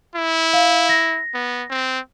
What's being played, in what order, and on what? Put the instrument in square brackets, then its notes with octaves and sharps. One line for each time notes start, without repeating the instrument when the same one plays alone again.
[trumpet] E4
[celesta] F5
A#6
[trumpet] B3
C4